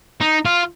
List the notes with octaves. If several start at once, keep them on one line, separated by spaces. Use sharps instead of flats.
D#4
F4